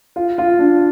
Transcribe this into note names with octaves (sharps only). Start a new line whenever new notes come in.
F4
F4
D4